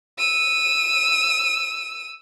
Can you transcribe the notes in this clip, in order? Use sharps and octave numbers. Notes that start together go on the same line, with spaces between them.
E6 D#7